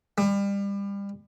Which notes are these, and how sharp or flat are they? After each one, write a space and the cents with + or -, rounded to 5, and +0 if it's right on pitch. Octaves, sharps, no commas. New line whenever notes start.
G3 +30